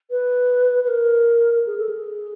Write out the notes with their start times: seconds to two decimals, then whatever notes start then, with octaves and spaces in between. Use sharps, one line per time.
0.11 B4
0.84 B4
0.88 A#4
1.67 G#4
1.78 A4
1.89 G#4